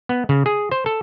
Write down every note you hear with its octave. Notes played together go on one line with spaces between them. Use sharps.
B3
C#3
G#4
C5
A4